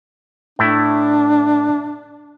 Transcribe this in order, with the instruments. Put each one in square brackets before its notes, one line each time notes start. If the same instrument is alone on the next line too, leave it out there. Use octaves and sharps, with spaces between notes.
[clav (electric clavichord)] A2 A3 E4 [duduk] D4